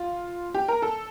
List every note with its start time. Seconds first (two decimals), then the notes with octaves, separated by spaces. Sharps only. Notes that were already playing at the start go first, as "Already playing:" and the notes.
Already playing: F4
0.54 G4
0.68 A#4
0.82 A4